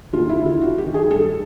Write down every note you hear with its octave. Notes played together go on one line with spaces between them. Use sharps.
D#2 F4
E4
D3
F4
F#2 F#4
G4
D#3
G#4
G2 A4